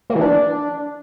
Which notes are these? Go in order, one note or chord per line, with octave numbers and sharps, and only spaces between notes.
A#3
E3
D4